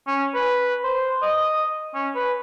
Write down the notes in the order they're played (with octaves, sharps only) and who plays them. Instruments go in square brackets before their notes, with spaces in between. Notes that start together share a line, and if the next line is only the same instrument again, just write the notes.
[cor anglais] C#4
B4
C5
D#5
C#4
B4